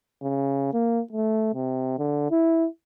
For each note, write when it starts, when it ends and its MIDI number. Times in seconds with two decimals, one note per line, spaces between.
0.23 0.72 49
0.73 1.01 58
1.13 1.54 57
1.54 1.95 48
1.99 2.31 50
2.31 2.67 64